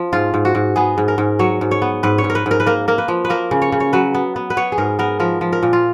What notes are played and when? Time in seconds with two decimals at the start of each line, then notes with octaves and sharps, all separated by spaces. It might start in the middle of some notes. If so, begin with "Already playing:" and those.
Already playing: F3
0.13 G#2 F4
0.34 G#2
0.45 F#4
0.55 G#2
0.76 B3 G#4
0.98 G#2
1.08 A#4
1.18 G#2
1.39 F#3 C#5
1.61 G#2
1.71 C#5
1.82 B3
2.03 G#2 B4
2.18 C#5
2.24 G#2
2.30 A#4
2.35 B4
2.46 G#2 A#4
2.60 B4
2.66 A#3 A#4
2.88 A#3 A#4
2.98 B4
3.08 F3
3.25 B4
3.30 A#3 A#4
3.51 C#3
3.62 C#5
3.72 C#3
3.80 C#5
3.93 F#3 B4
4.14 B3
4.36 B3
4.50 B4
4.57 B3 C#5
4.72 G#4
4.78 G#2 A#4
4.99 B3 A#4
5.20 F3 A#4
5.41 F3
5.53 A#4
5.63 A#2
5.73 F4